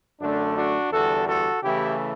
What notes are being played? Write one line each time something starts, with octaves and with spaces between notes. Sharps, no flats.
F#2 D3 A3 D4
D4 F#4
E2 D3 G3 F#4 A4
F#4 A4
C#3 E3 A3 E4 G4